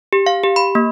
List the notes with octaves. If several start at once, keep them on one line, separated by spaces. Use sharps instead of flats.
G4
F5
G4
B5
A#3